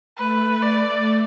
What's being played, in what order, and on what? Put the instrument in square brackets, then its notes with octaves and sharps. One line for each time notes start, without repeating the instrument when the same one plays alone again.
[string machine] A3 [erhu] B4
[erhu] D5